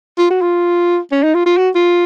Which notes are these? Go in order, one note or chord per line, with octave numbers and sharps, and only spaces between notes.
F4
F#4
F4
C#4
D#4
F4
F4
F#4
F4